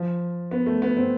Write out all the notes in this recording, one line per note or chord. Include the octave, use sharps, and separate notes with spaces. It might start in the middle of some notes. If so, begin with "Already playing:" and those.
Already playing: F3
B3
A3
B3
C4